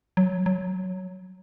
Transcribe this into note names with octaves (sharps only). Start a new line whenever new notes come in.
F#3
F#3